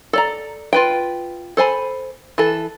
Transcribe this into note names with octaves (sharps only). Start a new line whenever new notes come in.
A4 D5 A#5
F4 B4 G5
A4 C5 G#5 B5
E3 A4